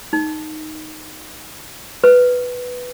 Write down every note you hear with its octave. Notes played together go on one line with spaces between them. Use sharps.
D#4
B4